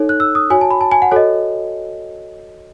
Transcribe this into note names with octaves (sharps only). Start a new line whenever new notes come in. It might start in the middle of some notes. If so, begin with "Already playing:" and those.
Already playing: D#4 A4 C#5
F#6
E6
D#6
F#4 C#5 G#5
A5
B5
A5
G#5
F#5
F#4 A4 C#5 D#5